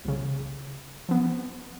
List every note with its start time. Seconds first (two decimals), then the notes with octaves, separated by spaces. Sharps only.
0.05 C2 C#3
1.09 F3 B3